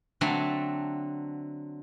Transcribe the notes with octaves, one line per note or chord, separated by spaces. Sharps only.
D3 F#3 A3 C4